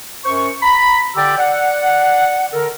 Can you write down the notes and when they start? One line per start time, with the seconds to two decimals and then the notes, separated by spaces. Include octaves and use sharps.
0.25 F#2 C5 C#6
0.62 A#5 B5
1.16 D3 G4 D5 G5 E6
1.38 D5 F#5
2.53 D3 A4 A#4